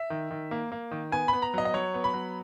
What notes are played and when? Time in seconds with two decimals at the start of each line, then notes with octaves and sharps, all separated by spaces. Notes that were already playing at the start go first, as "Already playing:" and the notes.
Already playing: E5
0.10 D#3
0.31 D#3
0.51 A#3
0.72 A#3
0.91 D#3
1.12 B3 G#5
1.28 B3 B5
1.42 A#5
1.54 F#3 D#5
1.65 D#5
1.74 F#3 C#5
1.94 B3
2.04 B5
2.14 F#3